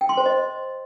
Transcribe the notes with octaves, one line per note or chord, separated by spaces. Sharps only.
G5
C6
C5
D#5